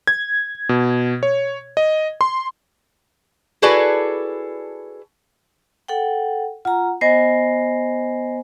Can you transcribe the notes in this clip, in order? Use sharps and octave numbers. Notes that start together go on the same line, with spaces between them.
G#6
B2
C#5
D#5
C6
E4 F#4 G#4 A4 B4 D5
A4 F#5 G5
F4 F#5 A#5
B3 C5 D#5 G#5 A#6 C7